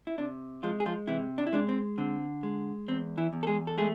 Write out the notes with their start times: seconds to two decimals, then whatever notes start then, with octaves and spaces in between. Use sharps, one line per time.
0.07 E4
0.18 C3 D4
0.63 F3 G#3 F4
0.80 G#4
0.86 F3 F4
1.07 C3 E3 E4
1.38 D4
1.47 E4
1.53 G#3 D4
1.69 C4
1.98 D3 C4
2.43 G#3
2.88 E2 C4
3.17 E3 E4
3.33 E2
3.43 A4
3.47 G#3 G#4
3.67 A4
3.78 G#3 A3 G#4